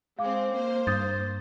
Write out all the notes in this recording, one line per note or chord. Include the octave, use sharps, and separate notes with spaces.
G#3 C4 F5 D6
A#3 C5
G2 D#6 G6 A6